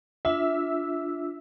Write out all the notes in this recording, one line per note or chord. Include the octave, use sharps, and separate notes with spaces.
D4 F4 E5 E6